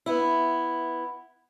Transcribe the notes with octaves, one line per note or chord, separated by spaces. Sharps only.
B3 E4